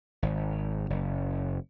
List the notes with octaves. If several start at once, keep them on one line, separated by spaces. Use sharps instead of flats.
G#1
F#1